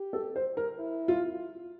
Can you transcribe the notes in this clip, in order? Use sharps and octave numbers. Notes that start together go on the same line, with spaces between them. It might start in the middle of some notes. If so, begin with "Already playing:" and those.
Already playing: G4
A4
C5
A#4
E4
F4